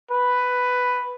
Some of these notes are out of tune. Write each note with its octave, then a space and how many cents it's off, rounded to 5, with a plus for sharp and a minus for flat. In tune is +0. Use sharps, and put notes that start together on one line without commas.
B4 +5